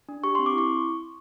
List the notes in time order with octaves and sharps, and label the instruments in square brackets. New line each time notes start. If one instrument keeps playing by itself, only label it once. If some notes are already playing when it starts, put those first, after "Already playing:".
[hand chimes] D4
G4 C#6
C6
C4
D6
E4 C#6